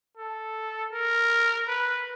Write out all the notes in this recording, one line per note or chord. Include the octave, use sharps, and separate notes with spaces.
A4
A#4
B4